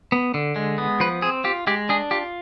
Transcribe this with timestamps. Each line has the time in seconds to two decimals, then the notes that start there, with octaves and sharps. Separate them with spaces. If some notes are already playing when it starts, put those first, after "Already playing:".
0.12 B3
0.34 D3
0.56 G#3
0.78 B3
1.00 F3 B4
1.22 C4 G#4
1.44 F4 G4
1.67 G#3 G4
1.89 D4 G#4
2.11 F4 G4